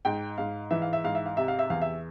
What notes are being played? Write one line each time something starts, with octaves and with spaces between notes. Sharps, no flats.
G#2 G5
G#2 F5
E3 E5
F5
E5
G#2 F5
E5
F5
C3 E5
F5
E5
E2 F5
E5